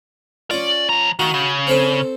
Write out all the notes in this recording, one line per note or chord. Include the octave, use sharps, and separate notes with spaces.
C#4 F4 D5
F3 A#5
D#3 F#4 F5
C#3
C4 A4 C5